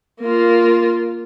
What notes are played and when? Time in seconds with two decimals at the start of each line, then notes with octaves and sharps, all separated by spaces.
0.21 A#3 F4